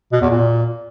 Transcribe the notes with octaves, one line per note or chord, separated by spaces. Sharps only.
B2
E2
A#2